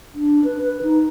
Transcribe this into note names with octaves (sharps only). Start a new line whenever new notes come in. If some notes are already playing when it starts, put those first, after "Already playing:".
D4
B4
B4
D#4